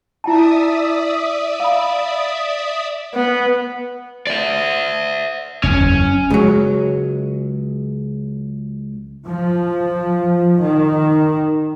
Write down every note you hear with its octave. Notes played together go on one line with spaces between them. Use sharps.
E4 D5 E5 G5 A5 D#6
F5 B5
B3
D5 E5
F#1 E2 C#4
C#2 F#3 G#3
F3
D#3